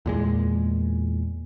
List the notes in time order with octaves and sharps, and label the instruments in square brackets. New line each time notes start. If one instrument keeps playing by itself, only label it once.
[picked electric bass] E2 A#2 G#3